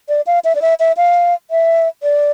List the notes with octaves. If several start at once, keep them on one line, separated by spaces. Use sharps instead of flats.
D5
F5
E5
D5
E5
E5
F5
E5
D5